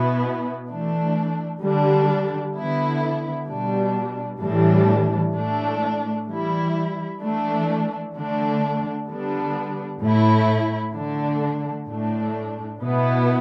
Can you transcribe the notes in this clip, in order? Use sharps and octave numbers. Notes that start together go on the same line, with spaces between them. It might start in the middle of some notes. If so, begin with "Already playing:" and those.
Already playing: B2 B3 E4
E3 A3 D4
D3 G3 D4
D3 B3 E4
B2 G3 D4
A2 E3 G3 D4
A2 A3 D4
E3 G3 E4
E3 A3 D4
D3 A3 D4
D3 G3 B3 D4
A2 A3 E4
D3 A3 D4
A2 A3 D4
B2 B3 E4